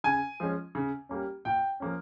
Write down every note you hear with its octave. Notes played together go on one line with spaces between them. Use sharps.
C#3 G#5
F3 G#3 C#4
C#3
G3 A#3 C#4
A#2 G5
F3 A#3 C#4